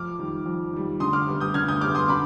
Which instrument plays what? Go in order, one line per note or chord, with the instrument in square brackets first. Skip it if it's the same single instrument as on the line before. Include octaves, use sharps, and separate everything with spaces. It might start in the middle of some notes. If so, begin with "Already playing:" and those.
Already playing: [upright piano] F2 D6 F6
D#3 G3
F2
D#3 G3
D3 C6 D#6
D6 F6
G3 B3
D#6 G6
D3 F6 G#6
D#6 G6
G3 B3 D6 F6
C6 D#6
D3 B5 D6